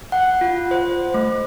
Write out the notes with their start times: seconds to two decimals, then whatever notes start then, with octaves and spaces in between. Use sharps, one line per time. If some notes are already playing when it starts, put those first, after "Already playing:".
0.12 F#5
0.41 F4
0.71 C5
1.14 A3